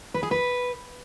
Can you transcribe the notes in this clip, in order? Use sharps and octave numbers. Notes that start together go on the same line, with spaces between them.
B4
G#4
B4